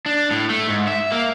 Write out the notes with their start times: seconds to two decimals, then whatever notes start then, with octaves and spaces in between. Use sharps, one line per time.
0.06 D4
0.31 A2
0.50 A3
0.69 G#2
0.88 E5
1.12 A#3